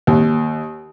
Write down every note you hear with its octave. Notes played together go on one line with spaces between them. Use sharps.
D#2